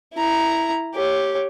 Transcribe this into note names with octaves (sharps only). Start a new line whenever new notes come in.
E4 A#5
G4 C#5